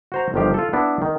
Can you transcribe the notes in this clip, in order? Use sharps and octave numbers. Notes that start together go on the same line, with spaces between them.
F#4 C5 A#5
G1 D#3 F3 G4 F5
F4 A4
B3 D4 E4
D#3